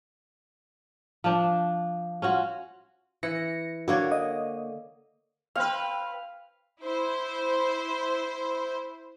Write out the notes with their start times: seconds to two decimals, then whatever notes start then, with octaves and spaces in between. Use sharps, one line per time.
1.24 F3 D4
2.22 C#4 F4 F#4
3.23 E3 A#6 C#7
3.88 D3 A#3 F#4 C#5
4.11 D#5
5.55 C4 B4 F5
6.82 E4 C5